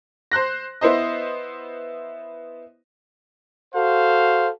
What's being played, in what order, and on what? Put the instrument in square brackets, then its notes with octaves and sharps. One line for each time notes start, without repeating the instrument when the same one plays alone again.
[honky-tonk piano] C5 C6 F#6 A#6
B3 E4 C5 D#5
[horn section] F#4 A4 C5 F5